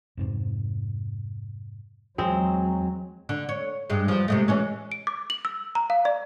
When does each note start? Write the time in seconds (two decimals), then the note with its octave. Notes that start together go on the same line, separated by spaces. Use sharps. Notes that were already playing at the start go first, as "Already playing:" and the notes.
0.17 F2 G#2 C3
2.18 E2 F#3 G#3 C4
3.29 D3
3.49 C#5
3.90 G2 G#3
4.08 E2 F3
4.28 C3 G#3 A3
4.48 E3 G#3 C#4
4.92 D7
5.07 D6
5.30 F#7
5.45 E6
5.75 A#5
5.90 F5
6.05 D5